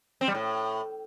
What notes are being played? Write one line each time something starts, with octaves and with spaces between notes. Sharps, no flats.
C4
G3
A2